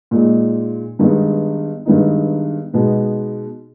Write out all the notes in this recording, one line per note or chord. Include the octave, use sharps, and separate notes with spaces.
A#2 G#3 D#4
G2 D#3 G#3 B3 D#4
G2 D#3 G#3 B3 D#4
B2 G#3 B3 D#4